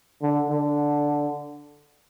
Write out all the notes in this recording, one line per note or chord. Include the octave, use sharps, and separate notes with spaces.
D3
D3